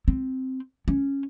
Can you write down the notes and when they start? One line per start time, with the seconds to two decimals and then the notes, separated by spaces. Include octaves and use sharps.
0.08 C4
0.88 C#4